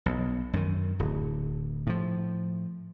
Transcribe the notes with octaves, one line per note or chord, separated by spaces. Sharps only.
B1
F#2 D#3
D1
A2 F3